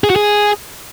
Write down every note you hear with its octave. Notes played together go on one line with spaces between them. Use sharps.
G#4
F#4
G#4